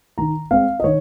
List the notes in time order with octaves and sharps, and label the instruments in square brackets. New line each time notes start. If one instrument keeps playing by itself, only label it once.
[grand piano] D#3 A#5
G#3 C4 F5
D#5
D#3 C#5